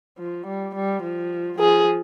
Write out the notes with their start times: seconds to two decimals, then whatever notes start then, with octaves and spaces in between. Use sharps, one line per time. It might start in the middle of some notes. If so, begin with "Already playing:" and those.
0.18 F3
0.47 G3
0.75 G3
1.03 F3
1.59 F3 G#4